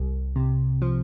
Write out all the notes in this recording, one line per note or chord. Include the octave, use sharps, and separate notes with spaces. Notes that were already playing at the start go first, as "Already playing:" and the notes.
Already playing: C2
C3
F3